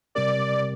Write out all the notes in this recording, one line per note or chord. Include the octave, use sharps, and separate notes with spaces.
C3 G3 C4 G4 A#4 D5